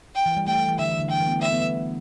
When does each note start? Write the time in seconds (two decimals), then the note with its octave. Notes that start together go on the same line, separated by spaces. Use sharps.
0.15 G5
0.26 E3
0.37 G3
0.47 A3 G5
0.58 G3
0.68 E3
0.79 D3 E5
0.89 E3
0.99 D3
1.10 E3 G5
1.20 E3
1.27 B3
1.31 A3
1.41 A3 E5
1.52 B3
1.63 G3